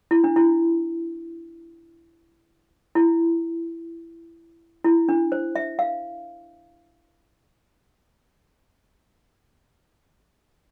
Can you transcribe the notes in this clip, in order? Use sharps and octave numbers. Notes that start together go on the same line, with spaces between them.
E4
D4
E4
E4
E4
D4
C5
E5
F5